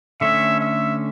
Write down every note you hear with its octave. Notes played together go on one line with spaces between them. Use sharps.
D3 A3 C#4 E5
E5